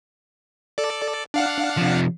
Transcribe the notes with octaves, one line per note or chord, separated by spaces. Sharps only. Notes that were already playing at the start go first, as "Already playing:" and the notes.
A4 D5
D4 F5 F#5
C3 F3